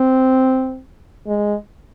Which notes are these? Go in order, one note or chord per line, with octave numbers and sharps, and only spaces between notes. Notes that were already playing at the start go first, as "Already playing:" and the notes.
Already playing: C4
G#3